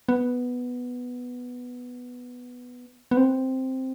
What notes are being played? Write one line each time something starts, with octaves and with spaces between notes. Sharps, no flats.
B3
B3
C4